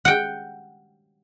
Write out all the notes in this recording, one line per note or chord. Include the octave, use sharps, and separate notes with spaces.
F#5 G5